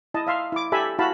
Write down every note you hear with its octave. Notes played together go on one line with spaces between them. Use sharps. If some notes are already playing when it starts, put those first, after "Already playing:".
E4 D#5 A5
E5 F5 C6
E4 D6
G4 A4 E5 G#5 B5
E4 F#4 F5 A5 B5